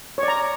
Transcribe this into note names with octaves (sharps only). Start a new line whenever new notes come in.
C#5
D5
A#5